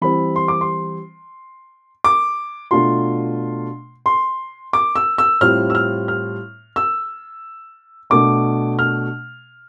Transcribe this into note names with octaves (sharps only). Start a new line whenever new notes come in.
E3 G3 C4 B5
C6
D6
C6
D6
B2 A3 D4 F4 C6
C6
D6
E6
E6
A2 G3 C4 F4 F6
E6
F6
F6
E6
B2 A3 D4 D6
F6